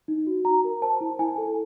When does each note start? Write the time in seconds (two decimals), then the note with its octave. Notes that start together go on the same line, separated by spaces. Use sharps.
0.08 D#4
0.27 F#4
0.45 F#4 A#5
0.64 A#4
0.82 C5 A5
1.01 E4
1.19 E4 G#5
1.38 A4